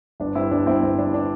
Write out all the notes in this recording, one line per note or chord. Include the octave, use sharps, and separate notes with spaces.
G1 D4
G2 C4 E4
G1 D4
G1 C4 E4
G1 C4
G2 D4
D4